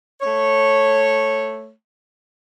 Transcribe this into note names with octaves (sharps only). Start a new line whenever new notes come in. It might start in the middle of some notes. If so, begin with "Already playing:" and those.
A3 C#5